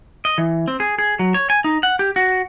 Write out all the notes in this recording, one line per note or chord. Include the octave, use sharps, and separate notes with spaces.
D#5
E3
C4
G#4
G#4
F#3
C#5
G#5
D#4
F#5
G4
F#4